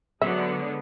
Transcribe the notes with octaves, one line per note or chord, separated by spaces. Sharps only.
D3 F#3 G#3 B3 E5